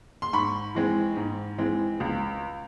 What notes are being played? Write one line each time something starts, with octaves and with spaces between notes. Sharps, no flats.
C6
G#2 B5 C#6
E3 G#3 C4
G#2
E3 G#3 C4
C#2